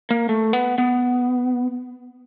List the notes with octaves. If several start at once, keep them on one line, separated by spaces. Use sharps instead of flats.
A#3
A3
B3
B3